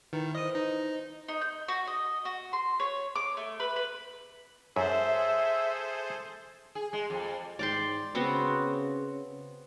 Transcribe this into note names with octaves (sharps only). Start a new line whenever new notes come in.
D#3 E4 B4
C5 D#5 D#6
D#4
D#4
G6
F#4
D#5
F#4
C6
C#5
D6
A3
B4
B4
F#2 G#4 A4 C5 E5
G#4
G#3
F2
G#2 D5 G5 C6
C#3 B3 C4 F#4